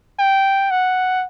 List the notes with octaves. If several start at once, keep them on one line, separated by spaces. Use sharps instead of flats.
G5
F#5